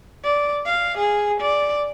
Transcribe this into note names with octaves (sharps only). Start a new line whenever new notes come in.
D5
F5
G#4
D5